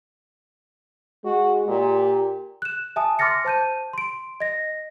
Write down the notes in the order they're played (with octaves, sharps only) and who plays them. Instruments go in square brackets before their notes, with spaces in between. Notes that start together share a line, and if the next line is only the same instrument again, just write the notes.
[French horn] G#3 [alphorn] F#4
[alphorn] A#2 [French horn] G4
[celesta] F#6 E7
E5 G#5 A5 D#6
C6 D6 F6 A6 A#6 C#7
C5 A5 G6 D#7
C6 D7
D#5 A#6